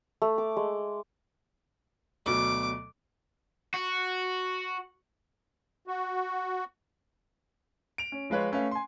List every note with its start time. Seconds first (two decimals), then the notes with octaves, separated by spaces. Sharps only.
0.22 A3
0.38 D6
0.57 G#3
2.26 D2 B2 F#3 D6
3.74 F#4
5.87 F#4
7.98 D7 F7
8.12 C#4
8.30 F3 G#3 F4 B4 C#5
8.52 A3 C#4 B4 F5
8.71 G#5 C6